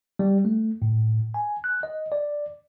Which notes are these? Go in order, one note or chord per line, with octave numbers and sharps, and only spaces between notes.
G3
A3
A2
G#5
F#6
D#5
D5